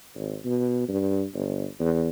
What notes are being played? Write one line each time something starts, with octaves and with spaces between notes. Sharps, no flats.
G#1
B2
G2
G1
E2